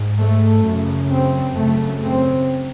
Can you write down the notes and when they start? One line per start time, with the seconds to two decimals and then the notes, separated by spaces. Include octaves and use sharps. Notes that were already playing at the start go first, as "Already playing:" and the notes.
Already playing: G#2
0.19 A3
0.66 F#2 C#3
1.11 C4
1.57 F#2 C#3 A3
2.03 C4